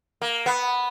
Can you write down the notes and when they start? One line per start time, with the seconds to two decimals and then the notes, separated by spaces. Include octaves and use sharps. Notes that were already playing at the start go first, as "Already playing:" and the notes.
0.21 A#3
0.46 B3